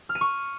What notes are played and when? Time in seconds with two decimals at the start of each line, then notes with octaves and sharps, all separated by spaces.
0.09 F6
0.15 D#7
0.21 C#6